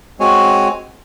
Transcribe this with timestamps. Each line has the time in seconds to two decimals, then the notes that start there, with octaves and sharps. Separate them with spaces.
0.19 G#3 C4 F#4 C#5 G#5